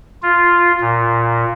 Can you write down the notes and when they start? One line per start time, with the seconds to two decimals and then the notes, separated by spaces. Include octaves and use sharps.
0.23 F4
0.80 A#2